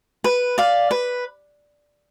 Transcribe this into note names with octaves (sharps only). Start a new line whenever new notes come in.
B4
D5 F5
B4